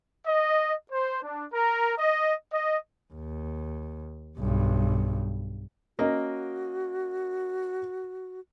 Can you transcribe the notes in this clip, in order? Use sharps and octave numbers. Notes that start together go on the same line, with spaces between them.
D#5
C5
D4
A#4
D#5
D#5
D#2
B1 G2
A#3 C#4 F#4 A#4 D#5